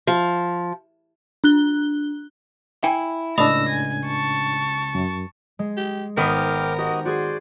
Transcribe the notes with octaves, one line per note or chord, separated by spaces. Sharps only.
F3
D4 F#6 G7
E4 G5 G#5
C#2 A2 D4 D#5 B5 D#6 E6 A#6
G#5
A5 C#6
F#2
G#3
G4
G#1 D#3 B3 A#4 C5 G5 D6 F6
F#4 G4 D#5
F#4 G#4 C5 D5 C6